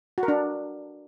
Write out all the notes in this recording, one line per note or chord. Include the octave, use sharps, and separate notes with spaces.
F#4
A#4
D4